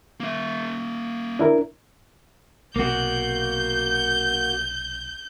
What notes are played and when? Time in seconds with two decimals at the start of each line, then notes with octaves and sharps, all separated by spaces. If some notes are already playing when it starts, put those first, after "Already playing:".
0.20 A#3 E5
1.39 D4 E4 A#4
2.76 B1 C3 A#3 F#4 G6